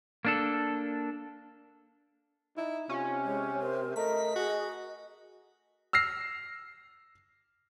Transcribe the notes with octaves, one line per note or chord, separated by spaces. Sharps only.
A#3 D4 A4
D#4 E4
C3 C#4 F4
G#3 C#5
A#4 C5
A3 A#4 D#5 B6
F#4 G#4
E6 F6 A#6 C7